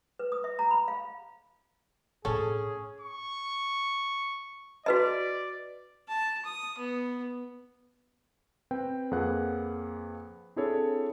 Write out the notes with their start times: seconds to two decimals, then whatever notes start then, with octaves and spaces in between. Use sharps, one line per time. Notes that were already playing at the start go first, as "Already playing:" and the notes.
0.19 B4
0.32 D#6
0.44 E5
0.59 A#5
0.71 B5
0.88 F5
2.25 A2 C4 C#4 G#4 A4
3.01 C#6
4.86 F#4 B4 D5 D#5
6.08 A5
6.45 D#6
6.78 B3
8.71 C4 B4 G5
9.11 F2 A#3 G#4 B4 F#5 F#6
10.56 C4 D4 E4 G#4 A4 C#5